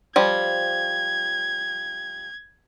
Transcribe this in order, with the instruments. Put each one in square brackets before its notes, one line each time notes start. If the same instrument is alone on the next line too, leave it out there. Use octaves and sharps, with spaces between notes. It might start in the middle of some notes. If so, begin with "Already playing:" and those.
[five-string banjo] F3 G3 [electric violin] G#6